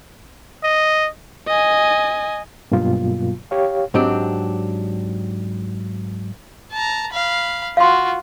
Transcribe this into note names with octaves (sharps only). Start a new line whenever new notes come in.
D#5
D#5 G#5
G2 B2 F#3 A#3 F4
G4 C#5 F5
G#2 F#3 C4 D4 G4
A5 A#5
F5 B5
F4 F#4 F5 C6